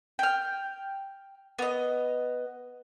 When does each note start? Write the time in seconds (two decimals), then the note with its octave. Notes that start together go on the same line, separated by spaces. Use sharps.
0.19 G5 F6
1.59 B3 D#5